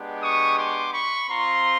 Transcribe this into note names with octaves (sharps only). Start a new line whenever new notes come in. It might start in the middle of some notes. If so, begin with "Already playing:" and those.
Already playing: G#3 B3 D4 G4
C#6 D#6
C6 D6
B5 C#6
C4 F4 A#5 C6